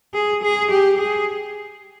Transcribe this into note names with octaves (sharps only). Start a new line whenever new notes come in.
G#4
G#4
G4
G#4